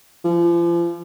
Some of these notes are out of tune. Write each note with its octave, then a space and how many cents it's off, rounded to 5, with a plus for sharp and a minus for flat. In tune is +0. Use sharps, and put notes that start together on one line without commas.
F3 -35